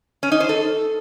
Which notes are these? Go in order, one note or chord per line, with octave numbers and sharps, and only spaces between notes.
C#4
D#4
C5
A4